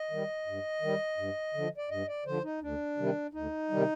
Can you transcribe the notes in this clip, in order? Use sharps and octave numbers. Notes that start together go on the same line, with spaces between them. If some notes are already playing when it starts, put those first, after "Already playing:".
Already playing: D#5
D#3 G3
G2
D#3 G3
G2
D3 F3
D5
G2 D#5
D5
D3 F3 C5
D#4
D2 D4
C3 D#3 G3
D2 D#4
C3 D#3 G3